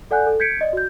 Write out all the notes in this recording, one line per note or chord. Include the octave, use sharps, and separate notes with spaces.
A4 D5 F#5 G#5 F#6 G6
A4
G6 G#6 B6 C#7 D7
D5 D#5
F#4 G6